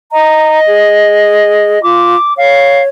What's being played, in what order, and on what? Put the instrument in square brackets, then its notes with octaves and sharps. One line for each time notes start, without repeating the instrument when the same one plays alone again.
[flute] D#5 [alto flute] A#5
[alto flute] G#4
[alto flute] F4 [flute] D6
[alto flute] C#5 [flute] F5